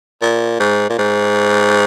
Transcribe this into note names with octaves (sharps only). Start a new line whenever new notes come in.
A#2
G#2
A#2
G#2